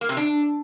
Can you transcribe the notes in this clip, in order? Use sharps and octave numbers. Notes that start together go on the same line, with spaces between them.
A#3
C3
D4